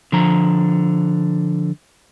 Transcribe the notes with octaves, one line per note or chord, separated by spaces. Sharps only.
D3 F3 A#5